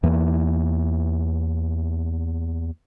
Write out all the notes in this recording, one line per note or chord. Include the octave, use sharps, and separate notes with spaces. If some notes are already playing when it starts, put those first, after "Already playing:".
E2 E3 A#3